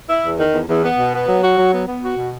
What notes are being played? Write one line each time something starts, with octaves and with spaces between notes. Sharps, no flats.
E4
E2
D#3
E2
E2
B3
B2
B3
F#3
F#4
F#3
B3
B3
F#4
B2